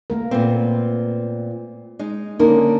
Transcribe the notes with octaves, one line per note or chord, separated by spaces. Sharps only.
A3 A#3 A#4
A#2 B3 C4
G#3 D#4
D3 A#3 C#4 D#4 A#4